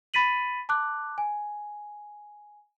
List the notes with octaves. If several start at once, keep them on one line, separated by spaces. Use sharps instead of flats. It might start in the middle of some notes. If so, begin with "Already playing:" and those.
B5 A6 B6 D#7 F#7
A5 D6 F#6
G#5